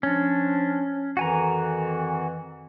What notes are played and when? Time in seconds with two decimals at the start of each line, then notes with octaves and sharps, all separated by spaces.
0.03 F3 C#4 D4
1.17 F2 D#3 E3 F#4 G#5 A#5